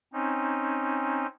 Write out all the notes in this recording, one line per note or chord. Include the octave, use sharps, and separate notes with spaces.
C4 C#4 D#4